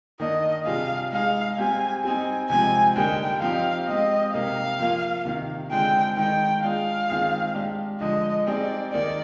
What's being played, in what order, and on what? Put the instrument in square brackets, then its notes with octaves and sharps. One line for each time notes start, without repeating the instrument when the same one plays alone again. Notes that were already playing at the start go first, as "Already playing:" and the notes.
[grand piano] D#3 A#3 D4 [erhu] D#5
[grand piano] C3 G3 D4 F4 G#4 [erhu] F5
[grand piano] G#3 D#4 G#4 [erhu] F5
[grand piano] G3 C4 G4 [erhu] G#5
[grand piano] G3 C4 D#4 [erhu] G#5
[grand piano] C3 F3 G#3 C4 [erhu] G#5
[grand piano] D3 G3 A#3 D#4 [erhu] G5
[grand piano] F3 C4 D#4 G4 [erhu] F5
[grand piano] G#3 C4 G4 [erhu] D#5
[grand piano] C3 G3 A#3 D#4 G4 [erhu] F5
[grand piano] F3 A#3 F4
C3 D#3 A#3
[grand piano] D3 G#3 C4 F4 G#4 [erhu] G5
[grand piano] D#3 G#3 D#4 [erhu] G5
[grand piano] G#3 D4 F4 G#4 [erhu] F5
[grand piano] D#3 G#3 C4 F4 G#4
G#3 D4 G4
[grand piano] D3 F3 G#3 [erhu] D#5
[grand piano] G3 C4 D#4 G#4 [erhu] D5
[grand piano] D#3 A#3 D#4 [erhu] D5